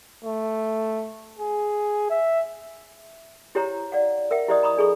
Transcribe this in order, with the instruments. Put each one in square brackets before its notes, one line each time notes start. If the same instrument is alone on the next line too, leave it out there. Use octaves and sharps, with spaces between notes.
[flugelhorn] A3
G#4
E5
[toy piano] E4 G4 C5 C#5 G5 A#5
D5 F5 F#5
A#4 E5 F#5 G5
E4 G4 C5 D5 D#5 D#6
A#5 B5 C#6 D#6
D4 G#4 A4 C#6